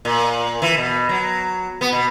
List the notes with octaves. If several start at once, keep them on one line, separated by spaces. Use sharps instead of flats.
A#2
E3
B2
F#3
B3
B2